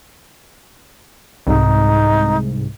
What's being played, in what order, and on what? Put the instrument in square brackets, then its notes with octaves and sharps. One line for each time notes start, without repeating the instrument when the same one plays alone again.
[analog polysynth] C2 G#2 [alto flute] D#4